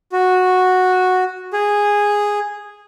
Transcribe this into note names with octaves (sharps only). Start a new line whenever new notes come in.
F#4
G#4